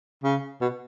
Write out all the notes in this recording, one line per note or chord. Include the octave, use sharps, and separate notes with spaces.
C#3
B2